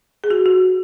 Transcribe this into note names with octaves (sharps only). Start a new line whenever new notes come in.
G#4
F#4
F#4